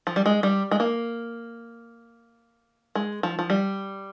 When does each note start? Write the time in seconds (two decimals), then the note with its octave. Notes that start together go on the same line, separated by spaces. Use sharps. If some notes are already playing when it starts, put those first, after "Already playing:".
0.07 F3
0.16 G3
0.26 G#3
0.43 G3
0.71 G#3
0.80 A#3
2.95 G#3
3.23 F3
3.39 F3
3.50 G3